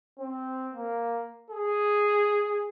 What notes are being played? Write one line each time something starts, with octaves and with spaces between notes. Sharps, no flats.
C4
A#3
G#4